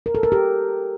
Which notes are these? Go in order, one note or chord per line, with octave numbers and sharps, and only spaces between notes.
A#4
A4
A#4
G4